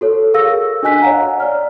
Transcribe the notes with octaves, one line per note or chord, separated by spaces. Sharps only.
F#4 A4 C#5
G#4 A#4 F5 E6 A#6
D4 F#4 D#5 G#5 F#6 B6
C#5 D#5 F5 F#5 A#5
D5 F6